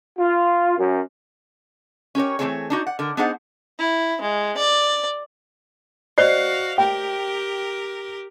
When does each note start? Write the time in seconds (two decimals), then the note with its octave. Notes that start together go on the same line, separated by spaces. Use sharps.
0.19 F4
0.77 F#2
2.15 C#4 G4 A#4 C#5
2.39 E3 F#3 A3 C4 G#4 C#5
2.70 D4 D#4 F#4
2.87 F#5
2.99 D3 A#4
3.17 B3 D4 D#4 G#4 C5 F#5
3.79 E4
4.21 G#3
4.57 D5
6.18 F#4 C5 D5 D#5 F5 C7
6.78 G4 A#4 G5